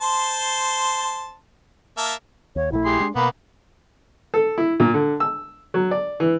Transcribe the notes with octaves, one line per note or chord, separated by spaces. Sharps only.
C5 A5 C6
A#3 E5 A5
D#2 C#5
A#1 A3 E4
G4 G#4 C6
G#3 D4
B2 A#3 B3 B5
A4
E4
A#2
D3
E6
F#3
D5
E3